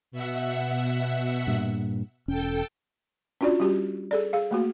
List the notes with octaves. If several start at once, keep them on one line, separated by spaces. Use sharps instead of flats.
B2 E5 F#5
G2 A#2
E1 C#4 A4 G5
C#4 D4 F4 F#4 D5
G3 C#4 F#4 G4
G#4 A4 D5
G#4 F5
A3 A#3 F#4